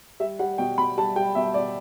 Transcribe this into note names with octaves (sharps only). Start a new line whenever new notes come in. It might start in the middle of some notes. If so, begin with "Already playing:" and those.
G3 E5
G3 F#5
B2 G5
B2 B5
G3 A5
G3 G5
B2 E5
B2 D5